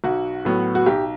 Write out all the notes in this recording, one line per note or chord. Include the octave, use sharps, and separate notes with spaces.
B1 F#4
A2 F#3 B3
F#4
B1 G4